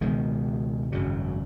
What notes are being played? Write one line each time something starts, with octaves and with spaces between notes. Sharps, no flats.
C#2 B2 D#3 G#3
G#1 F#2 C#3 F#3